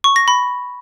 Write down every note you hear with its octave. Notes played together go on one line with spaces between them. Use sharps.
C#6
A#6
B5